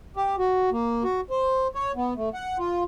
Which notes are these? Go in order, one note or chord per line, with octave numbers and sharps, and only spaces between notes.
G4
F#4
A#3
F#4
C5
C#5
B3
A3
F#5
F4